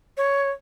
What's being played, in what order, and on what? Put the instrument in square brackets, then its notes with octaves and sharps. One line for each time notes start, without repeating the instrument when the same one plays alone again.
[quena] C#5